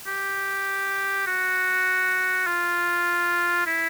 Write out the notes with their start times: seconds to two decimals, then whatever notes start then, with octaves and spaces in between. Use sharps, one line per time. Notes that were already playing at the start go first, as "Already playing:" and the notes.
0.07 G4
1.27 F#4
2.47 F4
3.67 E4